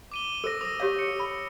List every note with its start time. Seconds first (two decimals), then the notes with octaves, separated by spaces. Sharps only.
0.12 D6 D#7 G7
0.44 A4 C5 E6 A#6
0.61 D6 D#6 A#6
0.80 G4 C#5 F5
0.99 C#7
1.20 B5